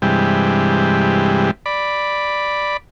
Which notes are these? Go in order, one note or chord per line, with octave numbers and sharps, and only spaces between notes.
G2 C3 E3 G3 G#3
D5 B5